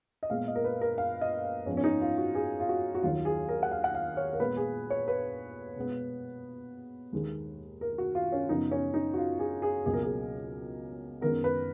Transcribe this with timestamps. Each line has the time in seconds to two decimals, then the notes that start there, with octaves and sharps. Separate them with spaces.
0.23 D#5
0.30 A#2 G#3 B3 F5
0.48 D#5
0.55 A#4
0.64 B4
0.81 A#4
0.98 F5
1.21 D#5
1.66 G#2 F3 B3 C#4
1.77 C#4
1.84 D#4
2.01 F4
2.18 F#4
2.35 G#4
2.60 F4
2.69 F#4
2.95 F#4
3.03 D#2 D#3 F#3 F4
3.25 G#4
3.49 A#4
3.63 F#5
3.71 F5
3.84 F#5
3.95 F5
4.17 C#5
4.33 A#4
4.40 A#2 G#3 B3 B4
4.57 G#4
4.90 C#5
5.08 B4
5.76 B2 G#3 B3
7.13 D#2 D#3 G#3
7.81 A#4
7.98 F#4
8.15 F4
8.32 C#4
8.49 F#2 C#3 F3 B3 D#4
8.72 C#4
8.94 D#4
9.14 F#4
9.17 F4
9.39 G#4
9.62 G#4
9.86 C#2 B2 F#3 A#3 G#4
9.93 A#4
10.03 G#4
11.21 F#2 D#3 G#3 B3 A#4
11.44 B4